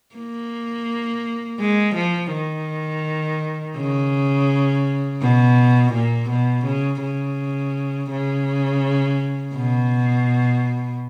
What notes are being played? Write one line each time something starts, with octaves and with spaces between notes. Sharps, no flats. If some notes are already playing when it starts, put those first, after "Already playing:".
A#3
G#3
F3
D#3
C#3
B2
A#2
B2
C#3
C#3
C#3
B2